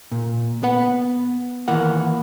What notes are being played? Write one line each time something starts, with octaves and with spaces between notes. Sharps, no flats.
A#2
B3 B4 F#5
D#3 E3 A#3 F#5